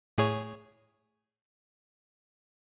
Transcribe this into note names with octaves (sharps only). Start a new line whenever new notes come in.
A2 G#4 C#5